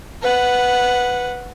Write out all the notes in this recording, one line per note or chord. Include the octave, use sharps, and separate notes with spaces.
B4 F#5